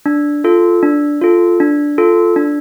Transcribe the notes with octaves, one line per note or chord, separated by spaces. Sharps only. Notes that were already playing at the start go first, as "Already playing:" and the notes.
D4
F4 A4
D4
F4 A4
D4
F4 A4
D4